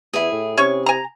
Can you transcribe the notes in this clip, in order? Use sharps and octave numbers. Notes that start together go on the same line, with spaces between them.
E2 E4 G#4
A2
C3 C#4 C#5 C#6
G#5 A#5